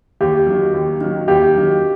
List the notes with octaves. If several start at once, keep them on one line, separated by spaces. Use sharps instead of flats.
D#2 G4
D#3 F#3
D#2
D#3 F#3
D#2 G4
D#3 F#3